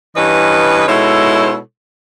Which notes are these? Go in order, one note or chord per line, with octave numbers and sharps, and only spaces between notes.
G2 E3 C#4 B4 D#5
B2 G#3 D#4 E4 A4 C#5